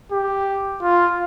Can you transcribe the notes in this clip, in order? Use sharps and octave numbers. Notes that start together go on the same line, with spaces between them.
G4
F4